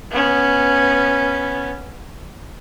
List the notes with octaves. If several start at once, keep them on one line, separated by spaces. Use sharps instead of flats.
B3 C#4